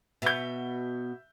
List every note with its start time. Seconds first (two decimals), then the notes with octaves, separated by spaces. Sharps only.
0.22 B2 B3 E5 G6